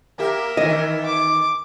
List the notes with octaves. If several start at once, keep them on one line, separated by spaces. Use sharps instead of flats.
A#3 G4 A#4 E5
D#3 E3 D#5
D6